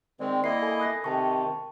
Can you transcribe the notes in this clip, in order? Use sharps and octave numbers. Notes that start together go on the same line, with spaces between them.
D#3 G#3 C4 D5 G5
A#3 E4 D#5 C7
A4 G#5 B5
D#6 F#6 A#6
C3 D#3 G5 A5 C#6